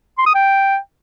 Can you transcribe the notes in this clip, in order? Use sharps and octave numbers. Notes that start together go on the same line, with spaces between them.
C6
D#6
G5